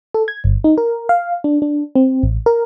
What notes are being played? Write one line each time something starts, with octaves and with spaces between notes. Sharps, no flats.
A4
G#6
G1
D#4
A#4
F5
D4
D4
C4
A1
A#4